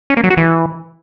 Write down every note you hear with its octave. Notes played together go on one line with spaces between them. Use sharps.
C#4
A#3
F#3
F#4
E3